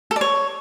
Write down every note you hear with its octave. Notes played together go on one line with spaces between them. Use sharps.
A4
D5
C#5